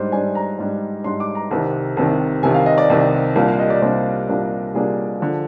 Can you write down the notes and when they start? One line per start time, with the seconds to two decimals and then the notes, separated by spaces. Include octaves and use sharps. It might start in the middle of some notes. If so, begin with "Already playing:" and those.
Already playing: G#2 G3 D4 C5
0.12 G#2 G3 D4 G#5
0.35 A#5
0.58 G#2 G3 D4
1.04 G#2 G3 D4 C6
1.20 D6
1.35 A#5
1.51 C2 C3 D#3
1.97 C2 C3 D#3
2.43 C2 C3 D#3 G#5
2.54 F5
2.66 D#5
2.78 D5
2.90 C2 C3 D#3
3.35 C2 A#2 G3 A#3 D4
3.48 F5
3.59 D#5
3.70 D5
3.82 C2 A#2 G3 A#3 D4 C5
4.28 C2 A#2 G3 A#3 D4
4.74 C2 A#2 G3 A#3 D4 G#4
5.20 D3 F3